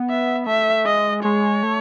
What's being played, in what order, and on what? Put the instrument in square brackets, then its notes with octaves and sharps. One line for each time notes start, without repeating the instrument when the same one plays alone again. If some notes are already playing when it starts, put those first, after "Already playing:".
Already playing: [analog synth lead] B3
[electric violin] E5
[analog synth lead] A3 [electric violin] E5
[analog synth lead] G#3 [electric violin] D#5
[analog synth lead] G#3 [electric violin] C#5
[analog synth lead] A3